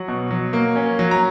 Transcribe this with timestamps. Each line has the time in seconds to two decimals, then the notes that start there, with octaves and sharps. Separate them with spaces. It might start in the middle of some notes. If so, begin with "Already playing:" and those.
Already playing: F#3 F#5
0.08 B2
0.31 F#3
0.53 A#3
0.76 C#4
0.99 F#3
1.11 A#5